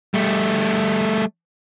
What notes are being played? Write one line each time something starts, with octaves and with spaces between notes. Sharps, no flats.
G3 A3